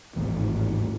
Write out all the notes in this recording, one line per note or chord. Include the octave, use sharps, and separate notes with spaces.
G#1 D#2 A2 E3